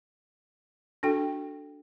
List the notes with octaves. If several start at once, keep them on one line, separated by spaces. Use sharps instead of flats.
D4 F#4 A4 G5